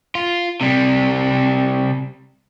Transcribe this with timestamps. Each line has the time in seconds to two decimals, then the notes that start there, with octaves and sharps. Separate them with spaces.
0.15 F4
0.61 C3 G3